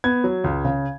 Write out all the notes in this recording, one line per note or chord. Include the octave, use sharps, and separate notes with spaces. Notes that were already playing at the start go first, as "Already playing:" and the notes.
B3 G#6
F#3
C#2
C#3